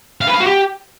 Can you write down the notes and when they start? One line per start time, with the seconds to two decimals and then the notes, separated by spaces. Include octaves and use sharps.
0.21 F5
0.28 B4
0.34 F5
0.40 F#4
0.47 G4